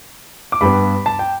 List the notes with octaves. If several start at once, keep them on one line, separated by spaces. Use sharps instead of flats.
D6
G2 G3 B3 B5
A5
G5